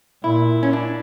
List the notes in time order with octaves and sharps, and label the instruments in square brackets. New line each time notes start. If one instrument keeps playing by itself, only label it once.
[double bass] A#2 [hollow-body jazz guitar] E4
[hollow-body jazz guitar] C#4
D4